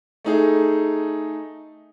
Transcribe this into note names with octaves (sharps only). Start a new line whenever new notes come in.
A3 D#4 G#4